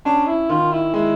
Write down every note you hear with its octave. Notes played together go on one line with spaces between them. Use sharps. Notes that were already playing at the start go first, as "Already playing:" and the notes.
C#4 D4
E4
D#3 F4
E4
G#3 E4